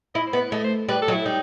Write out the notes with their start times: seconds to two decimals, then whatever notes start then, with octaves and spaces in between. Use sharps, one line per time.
0.14 E4 D#5
0.27 C5
0.33 B3
0.40 B4
0.51 A3 D#5
0.64 C5
0.89 G3 B4
1.02 A4
1.08 F#3
1.14 E4
1.26 G3 D#4